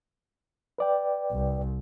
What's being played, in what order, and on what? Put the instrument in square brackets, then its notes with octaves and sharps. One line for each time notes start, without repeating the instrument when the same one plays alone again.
[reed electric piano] B4 D5 G5
[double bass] C2